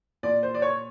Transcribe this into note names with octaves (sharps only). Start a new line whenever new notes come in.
A#2 D5
C5
D5
C#5